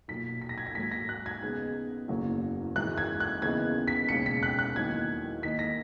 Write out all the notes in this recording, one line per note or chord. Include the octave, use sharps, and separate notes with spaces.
B1 A#2 F#3 B6
B6
A#6
G#6
A#6
G#1 G#2 F#3 A#3 B6
A#6
F#6
G#6
D#2 C#3 G#3 B3 D#4 G#6
F#1 E2 C#3 F#3 A#3
G#1 F#2 E3 G#3 F#6
G#6
F#6
D#2 C#3 E3 B3 D#4 G#6
B6
E1 D#2 C#3 C#7
B6
F#6
F#6
E2 D#3 F#3 A#3 D#4 G#6
D#2 D#3 A#3 D#4 B6
A#6